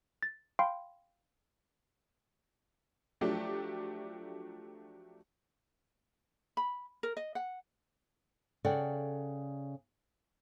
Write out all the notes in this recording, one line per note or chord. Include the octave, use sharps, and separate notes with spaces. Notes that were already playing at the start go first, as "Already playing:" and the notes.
A6
F5 G5 B5 C6
F3 F#3 A3 D4 G4
B5
A#4
D#5
F#5
C#3 A4 D5 F#5 G5